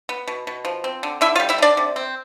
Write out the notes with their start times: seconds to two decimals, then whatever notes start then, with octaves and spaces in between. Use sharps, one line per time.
0.09 B3
0.28 B2
0.47 B2
0.65 F3
0.84 C4
1.03 D3
1.21 D3 E4 E5
1.35 F4 F5
1.40 G3
1.49 E4 E5
1.58 D3 D4 D5
1.77 C3
1.96 C4